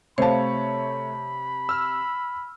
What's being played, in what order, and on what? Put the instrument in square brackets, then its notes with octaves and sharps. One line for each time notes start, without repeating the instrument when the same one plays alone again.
[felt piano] C3 A5 [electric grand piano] A3 C#5 [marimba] C5 F5 [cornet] B5
[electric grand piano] E6 F6